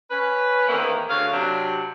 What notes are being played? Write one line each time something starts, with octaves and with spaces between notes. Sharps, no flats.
C#4 B4
E2 A2 D#3 E3 A#3 C4
D2 C#4 F#4 G#4 F5
C3 F#3 D4